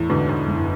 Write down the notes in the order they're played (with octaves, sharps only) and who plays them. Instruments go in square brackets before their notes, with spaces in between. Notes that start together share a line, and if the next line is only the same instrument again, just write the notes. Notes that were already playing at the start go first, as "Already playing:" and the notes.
Already playing: [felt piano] E2 [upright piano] A2
[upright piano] G#2 B2 [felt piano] D3
[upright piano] G#2
[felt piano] F#1